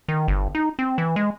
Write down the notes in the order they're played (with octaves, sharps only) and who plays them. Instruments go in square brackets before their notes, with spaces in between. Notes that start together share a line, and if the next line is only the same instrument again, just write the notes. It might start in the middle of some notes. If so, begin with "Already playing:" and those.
[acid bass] D#3
G1
D#4
C4
E3
G#3